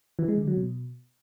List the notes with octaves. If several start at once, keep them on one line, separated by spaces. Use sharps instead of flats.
E3
G#3
D3
F#3
B2